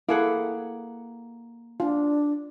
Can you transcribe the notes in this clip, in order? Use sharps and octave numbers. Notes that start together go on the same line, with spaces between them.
A#3 E4 G#4 A4 F#5
D4 F4